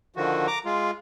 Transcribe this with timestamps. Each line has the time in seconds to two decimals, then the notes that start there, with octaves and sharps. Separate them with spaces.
0.16 D3 D#3 F3 F#4
0.47 A#5 D6
0.66 G#3 F4